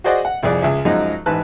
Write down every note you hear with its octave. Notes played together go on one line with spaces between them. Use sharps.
F#4 G#4 C5 D5 D#5 F#5
F#5
C2 F2 G#4 D5
C#2 G#4 E5
F#2 F3 F#3 G#3 D#4
A1 G#2 B4 A5 F#6